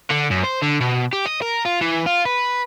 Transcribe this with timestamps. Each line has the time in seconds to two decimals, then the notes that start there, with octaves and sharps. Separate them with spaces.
0.11 D3
0.31 F#2
0.44 C5
0.63 D3
0.81 B2
1.13 G4
1.25 D#5
1.42 A#4
1.65 F4
1.81 E3
2.06 F4
2.25 B4